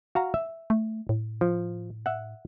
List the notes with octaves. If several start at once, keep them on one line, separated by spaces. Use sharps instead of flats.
F#4 F5 A#5
E5
A3
A2
F3
E5 F#5